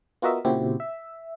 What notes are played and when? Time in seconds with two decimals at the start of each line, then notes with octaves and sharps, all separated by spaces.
0.22 B3 F4 F#4 A#4 D#5 E5
0.45 A#2 C#3 C4 E4 F#4 G4
0.80 E5